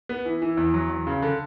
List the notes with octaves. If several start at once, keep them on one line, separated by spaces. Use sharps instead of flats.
B3
E3
E3
E2
F#3
E2
C#3
D3